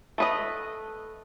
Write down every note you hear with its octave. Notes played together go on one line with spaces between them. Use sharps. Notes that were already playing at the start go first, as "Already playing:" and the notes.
A3 B4 D#5